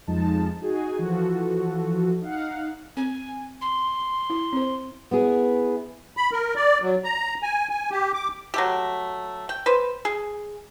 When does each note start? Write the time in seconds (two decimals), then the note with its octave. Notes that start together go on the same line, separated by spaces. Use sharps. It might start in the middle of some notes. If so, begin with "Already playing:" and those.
0.07 F2 F3 G#3 D#4 A5
0.61 D#4 F#4 G#4 G#5
0.99 E3 F3 F#4 A4
2.21 D#4 F5 F#5
2.97 C4 G#5
3.61 C6
4.30 E4
4.53 C4 C5
5.11 B3 E4 G#4
6.17 B5
6.32 A#4
6.56 D5
6.82 F#3
7.04 A#5
7.43 G#5
7.70 G#5
7.91 G4
8.14 D6
8.54 F#3 A3 G4
9.49 G5
9.66 B4 C5
10.05 G#4